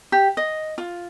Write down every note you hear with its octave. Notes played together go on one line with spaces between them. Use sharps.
G4
D#5
F4